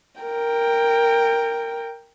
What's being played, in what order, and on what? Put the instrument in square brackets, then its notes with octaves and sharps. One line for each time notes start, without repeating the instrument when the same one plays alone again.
[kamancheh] A#4 G5